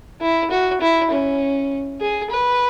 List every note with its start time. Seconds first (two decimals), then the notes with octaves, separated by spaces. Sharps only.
0.22 E4
0.51 F#4
0.81 E4
1.11 C#4
2.01 G#4
2.31 B4